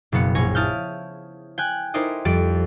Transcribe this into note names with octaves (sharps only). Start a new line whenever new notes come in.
F#1 B2 B3 C#7
A#1 C#5 G#5 A#6
E4 A5 D#6 F6 G6
G5 G#5 F#6
D#4 E4 A#4 C5 D5 D#5
F2 G3 G4 A6 D7